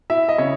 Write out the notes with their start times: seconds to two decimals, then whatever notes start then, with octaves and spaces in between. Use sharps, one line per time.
0.10 E4 E5
0.29 D#5
0.38 C#3 C#5